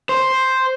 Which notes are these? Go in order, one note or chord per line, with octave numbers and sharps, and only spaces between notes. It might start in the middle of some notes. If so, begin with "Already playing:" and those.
C5